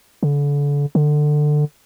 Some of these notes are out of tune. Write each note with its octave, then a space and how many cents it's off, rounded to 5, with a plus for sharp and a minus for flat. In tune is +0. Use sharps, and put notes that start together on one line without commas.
D3 -35
D3 +20